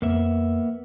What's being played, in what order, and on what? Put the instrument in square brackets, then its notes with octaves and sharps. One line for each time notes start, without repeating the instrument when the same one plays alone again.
[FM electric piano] F2 [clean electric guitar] A#3 B3 E5